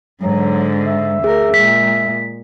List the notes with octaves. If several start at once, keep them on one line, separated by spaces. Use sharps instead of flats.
G#2 D3 F#3
E5
D2 G#4 A#4
A#2 G#3 B6